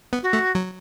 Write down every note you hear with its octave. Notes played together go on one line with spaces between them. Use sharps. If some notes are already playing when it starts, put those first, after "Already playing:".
B3
F#4
A3
F#3